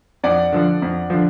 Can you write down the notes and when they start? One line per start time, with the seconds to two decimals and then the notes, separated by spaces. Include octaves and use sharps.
0.23 F2 D5 F#5
0.52 D3 F3
0.82 F2
1.10 D3 F3